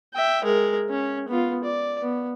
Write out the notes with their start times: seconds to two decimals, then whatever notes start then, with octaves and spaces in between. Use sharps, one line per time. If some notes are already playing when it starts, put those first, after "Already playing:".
0.14 E5 G5
0.44 G#3 A#4
0.89 C#4
1.28 B3 F4
1.64 D5
2.00 B3